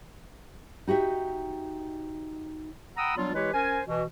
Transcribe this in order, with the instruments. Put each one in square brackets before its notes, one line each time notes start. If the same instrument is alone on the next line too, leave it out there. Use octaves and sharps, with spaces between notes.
[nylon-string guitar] D#4 F#4 G4 E5
[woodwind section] F#5 G5 A#5 B5 D#6 E6
F#3 G3 B3 D4 F4
E3 G#3 E4 G4 B4 C#5
C#4 A#4 C5 G#5
B2 E3